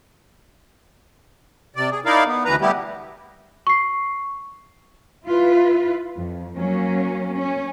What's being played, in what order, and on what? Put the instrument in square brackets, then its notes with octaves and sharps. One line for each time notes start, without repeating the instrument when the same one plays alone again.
[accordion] C3 D5
G#4
D#4 E4 A#4 D5 F5
B3
D2 E3 B4 A#5
G3 A3 B3 E4 G4
[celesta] C#6 C7
[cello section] E4 F4 B4
F2
F#3 A#3 C#4
C#4